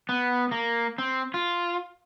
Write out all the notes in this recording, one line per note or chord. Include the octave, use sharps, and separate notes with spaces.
B3
A#3
C4
F4